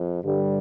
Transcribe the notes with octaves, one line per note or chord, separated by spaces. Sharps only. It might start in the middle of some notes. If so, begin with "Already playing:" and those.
Already playing: F2
G2 D3 G3